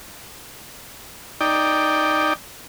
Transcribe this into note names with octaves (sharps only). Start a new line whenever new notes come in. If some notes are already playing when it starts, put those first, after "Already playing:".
D#4 D5 G5